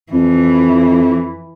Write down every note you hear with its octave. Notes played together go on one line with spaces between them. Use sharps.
F2 E3